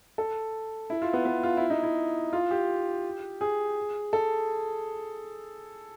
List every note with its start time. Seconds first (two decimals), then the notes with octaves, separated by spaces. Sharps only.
0.18 A4
0.90 E4
1.02 F4
1.13 B3
1.25 B3
1.43 F4
1.57 E4
1.70 D#4
1.83 E4
2.33 F4
2.51 G4
3.41 G#4
4.13 A4